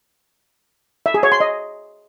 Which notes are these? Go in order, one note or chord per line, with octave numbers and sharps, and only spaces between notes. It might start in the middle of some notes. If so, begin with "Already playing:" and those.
E5
G#4
C#5
C6
D#5